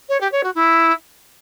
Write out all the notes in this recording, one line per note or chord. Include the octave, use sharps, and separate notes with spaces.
C#5
G4
C#5
F#4
E4